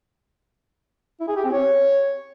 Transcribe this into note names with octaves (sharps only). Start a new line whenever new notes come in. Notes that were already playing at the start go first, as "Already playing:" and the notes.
E4
G#4
G4
C4
C#5